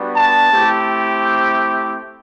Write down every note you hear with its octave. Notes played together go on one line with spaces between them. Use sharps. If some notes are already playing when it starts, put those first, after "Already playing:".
Already playing: G3 B3 D4 F#4
A5
A3 C4 E4 G4